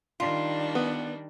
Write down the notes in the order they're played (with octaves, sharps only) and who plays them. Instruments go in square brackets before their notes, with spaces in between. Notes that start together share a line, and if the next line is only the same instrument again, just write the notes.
[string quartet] D#3 G3 D4 [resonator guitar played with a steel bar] F4
[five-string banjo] B3